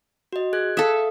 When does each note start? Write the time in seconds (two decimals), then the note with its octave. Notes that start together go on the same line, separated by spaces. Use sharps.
0.33 F#4 D#5
0.53 G#4 F#6 G#6
0.77 A4 E5 F5 D#6